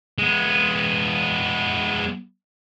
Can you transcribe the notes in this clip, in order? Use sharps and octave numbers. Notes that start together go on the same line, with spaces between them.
G#3 B3